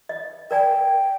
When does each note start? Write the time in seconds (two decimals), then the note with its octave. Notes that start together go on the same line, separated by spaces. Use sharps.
0.09 D#5
0.51 A#4 D5 G5 G#5